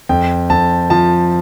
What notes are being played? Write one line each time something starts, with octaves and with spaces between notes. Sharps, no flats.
F2 G5
F2 A5
F3 A5